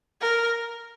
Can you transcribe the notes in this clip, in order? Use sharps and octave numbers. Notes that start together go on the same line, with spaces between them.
A#4